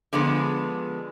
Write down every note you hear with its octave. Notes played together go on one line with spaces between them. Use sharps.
D3 F3 G#3 B3